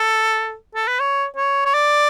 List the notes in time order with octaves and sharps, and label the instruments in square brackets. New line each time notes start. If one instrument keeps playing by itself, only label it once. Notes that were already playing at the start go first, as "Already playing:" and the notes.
Already playing: [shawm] A4
A4
B4
C#5
C#5
C#5
D5